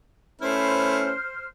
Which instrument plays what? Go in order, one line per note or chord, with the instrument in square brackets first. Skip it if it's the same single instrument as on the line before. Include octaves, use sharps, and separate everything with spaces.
[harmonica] A3 E4 B4 [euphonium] C#4 [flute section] C5 F6